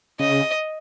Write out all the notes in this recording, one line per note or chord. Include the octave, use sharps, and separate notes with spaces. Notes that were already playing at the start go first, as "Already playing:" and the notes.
C#3 D#5